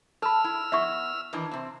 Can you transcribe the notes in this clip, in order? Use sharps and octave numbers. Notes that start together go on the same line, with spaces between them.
A4 A5 B5 E6 F6
E4
B3 E4 E5 C#6
D#3 E3 D4
C3 C4